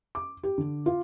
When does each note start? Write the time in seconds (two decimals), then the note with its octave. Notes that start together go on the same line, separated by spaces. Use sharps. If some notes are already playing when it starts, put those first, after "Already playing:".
0.15 D6
0.43 G4
0.58 D3
0.86 F4